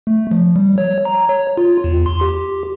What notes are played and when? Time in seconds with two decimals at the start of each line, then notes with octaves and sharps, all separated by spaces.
0.07 A3
0.31 F3
0.56 G3
0.78 C#5
1.05 A#5
1.29 C#5
1.58 F4
1.84 E2
2.06 C6
2.21 G4